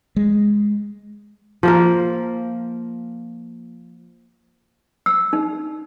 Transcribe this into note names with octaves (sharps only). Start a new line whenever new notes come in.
G#3
F3 A#3 A#4
E6
D#4